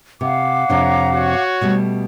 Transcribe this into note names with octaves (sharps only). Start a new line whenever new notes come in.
C3 F5 F#5 D6
F2 C3 D4 C#5 A#5
F#4 C#5
B2 G3 A3